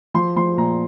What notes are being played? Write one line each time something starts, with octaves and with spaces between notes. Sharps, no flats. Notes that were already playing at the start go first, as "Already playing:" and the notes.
F3 C6
F3 C6
A#2 A#5